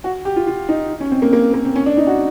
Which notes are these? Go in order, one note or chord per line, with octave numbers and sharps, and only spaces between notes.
F#4
G4
F4
F4
D#4
C#4
C4
A#3
A#3
A#3
C4
C#4
D4
D#4
F#4